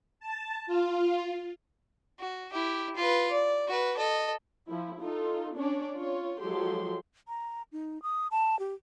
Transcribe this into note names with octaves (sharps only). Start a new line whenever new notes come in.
A5
F4
F#4
E4 G4
F4 B4
D5
F#4 B4
A4 D#5
F3 E4
D#4 F4 A4
C#4 D4 C#5 D5
F4 C#5
F3 F#3 G#3 G4 A4 C6
A#5
D#4
D#6
A5
G4